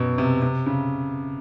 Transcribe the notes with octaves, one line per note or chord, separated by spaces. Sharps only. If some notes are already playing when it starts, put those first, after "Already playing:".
Already playing: F#2 B2
C3
C3
C#3